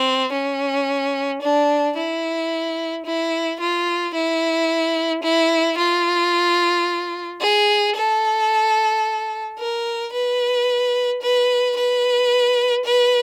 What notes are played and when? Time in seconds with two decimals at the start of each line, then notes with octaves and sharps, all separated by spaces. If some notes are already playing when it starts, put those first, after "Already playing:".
Already playing: C4
0.33 C#4
1.42 D4
1.97 E4
3.06 E4
3.60 F4
4.14 E4
5.23 E4
5.78 F4
7.41 G#4
7.96 A4
9.59 A#4
10.13 B4
11.22 B4
11.77 B4
12.85 B4